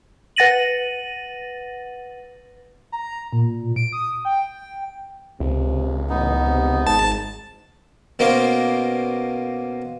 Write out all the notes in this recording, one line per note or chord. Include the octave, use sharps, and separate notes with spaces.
B4 F#5 A6 A#6 D#7 F#7
A#5
A#2
D7
D#6
G5
C#2 C3
A1 B3 D#4
C3
G#1 G#2 A5
B2 A#3 C#4 C5